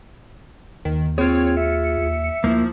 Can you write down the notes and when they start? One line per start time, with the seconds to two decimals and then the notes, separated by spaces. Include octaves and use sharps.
0.85 D#2 D#3
1.18 C4 F4 G#4 C#5
1.57 E5 C#7
1.98 D#2
2.44 D2 F3 A#3 E4